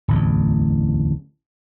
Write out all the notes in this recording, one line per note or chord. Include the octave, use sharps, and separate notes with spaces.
D1 A1 E2